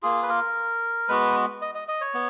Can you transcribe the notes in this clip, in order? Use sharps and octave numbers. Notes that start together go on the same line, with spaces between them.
A#3 F4 G#4
B4
A#4
G#3 B3 F#4 B4
D#5
D#5
D#5
C#5
B3